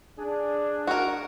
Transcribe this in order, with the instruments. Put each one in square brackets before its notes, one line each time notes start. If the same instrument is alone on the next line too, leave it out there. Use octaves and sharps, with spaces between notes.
[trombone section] D4 G#4
[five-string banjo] F#4 A#4